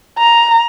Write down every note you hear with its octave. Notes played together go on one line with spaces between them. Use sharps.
A#5